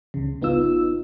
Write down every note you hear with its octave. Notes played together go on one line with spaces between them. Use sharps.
C#2 C#3
G#1 B3 D#4 F4 E6